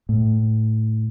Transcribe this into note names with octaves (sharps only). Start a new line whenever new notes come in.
A2